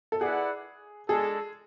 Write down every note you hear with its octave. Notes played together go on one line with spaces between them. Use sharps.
A4
E4 G#4 B4 D5 F#5
G#3 D4 G#4 A4